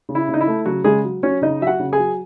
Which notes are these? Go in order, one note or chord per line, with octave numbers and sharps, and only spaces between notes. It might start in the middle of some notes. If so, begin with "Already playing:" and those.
C#3
E4
C#3
D#4
E4
A3
C#3 F#3 F#4
C#3 G#3 G#4
F#3
F#3 C#4 C#5
C#3 D#4 D#5
F#3 E5
F#4 F#5
C#3
G#4 G#5
F#3